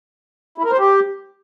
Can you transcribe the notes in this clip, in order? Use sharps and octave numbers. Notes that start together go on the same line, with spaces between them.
E4
A#4
C5
G4